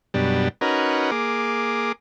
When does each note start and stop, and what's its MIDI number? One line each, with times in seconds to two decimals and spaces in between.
0.14 0.48 42
0.14 0.48 47
0.14 0.48 55
0.14 0.48 62
0.61 1.11 61
0.61 1.11 63
0.61 1.11 66
0.61 1.11 70
0.61 1.11 71
1.11 1.92 58
1.11 1.92 68
1.11 1.92 86